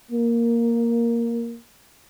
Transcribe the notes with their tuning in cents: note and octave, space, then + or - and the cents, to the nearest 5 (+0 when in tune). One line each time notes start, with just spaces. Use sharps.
A#3 +0